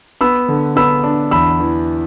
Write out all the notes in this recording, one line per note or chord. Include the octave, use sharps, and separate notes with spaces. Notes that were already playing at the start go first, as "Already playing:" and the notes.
B3 B5 E6
D3
B3 B5 E6
D4
E2 B5 E6
E3